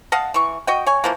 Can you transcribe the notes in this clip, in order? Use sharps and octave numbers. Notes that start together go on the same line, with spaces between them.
D#5 F5 F#5 A5
E3 C#6
F#4 D#5 G5
C#5 G#5
E3 F3 A#3